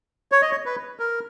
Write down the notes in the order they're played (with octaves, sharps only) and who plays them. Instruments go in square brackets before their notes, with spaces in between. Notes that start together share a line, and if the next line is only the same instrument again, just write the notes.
[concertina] C#5
D#5
C#5
B4
A#4